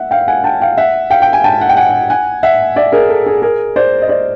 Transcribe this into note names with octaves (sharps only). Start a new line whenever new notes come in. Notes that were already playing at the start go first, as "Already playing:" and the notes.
Already playing: E5 F#5
F5 G5
F#5 G#5
G5 A5
F5 G5
E5 F#5
F5 G5
G5
G#5
G5 A5
F#5
G5
F#5 G#5
F#5 G#5
E5 F#5
D5 E5
G#4 A#4
A4
G#4
G#4 A#4
C5 D5
D#5
C5 D5